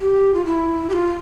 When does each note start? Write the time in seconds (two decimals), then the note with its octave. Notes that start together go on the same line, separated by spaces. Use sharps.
0.01 G4
0.34 F4
0.46 E4
0.90 G4
0.93 F4